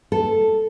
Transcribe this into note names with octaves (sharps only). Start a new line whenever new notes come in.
A4